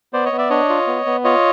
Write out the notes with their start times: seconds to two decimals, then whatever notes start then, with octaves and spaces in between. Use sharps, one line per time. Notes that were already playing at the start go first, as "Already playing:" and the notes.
0.13 B3 C5 D5
0.26 C#5 D#5
0.32 B3
0.38 D5 E5
0.50 D4 C#5 D#5
0.69 F4
0.87 B3
1.06 B3
1.24 F4 C#5 D#5